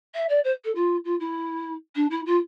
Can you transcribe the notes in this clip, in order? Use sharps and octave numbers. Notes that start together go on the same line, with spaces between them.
E5
D5
C5
A4
F4
F4
E4
D4
E4
F4